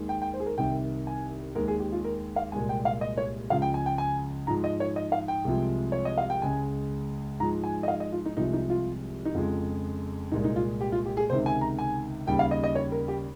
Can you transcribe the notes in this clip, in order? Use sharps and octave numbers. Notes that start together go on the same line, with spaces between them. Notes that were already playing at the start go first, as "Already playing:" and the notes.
Already playing: D#2 D#3 G#3
G5
G5
C5
G#4
A#4
C2 C3 D#3 G5
G#5
D#2 D#3 G#3 A#4
G#4
G4
F4
A#4
F5
C2 A#2 G#3 G#5
G5
F5
D#5
C#5
C#2 C#3 F3 G#3 F5
G5
G#5
G5
G#5
G#2 F3 G#3 A#5
D#5
C#5
D#5
F5
G5
C2 C3 F3 G#3
C#5
D#5
F5
G5
C#2 C#3 G#3 G#5
G#2 F3 G#3 A#5
G#5
D#5
F5
D#5
F4
D#4
C2 C3 F3 G#3 D#4
D#4
F4
D#4
F2 C#3 G#3 F4
C2 A#2 G#3 D#4
D#4
F4
G4
F4
G4
G#4
C#2 C3 D#3 C5
G#5
A#5
G#5
D#2 C#3 G3 G5
F5
D#5
D#5
C#5
A#4
G4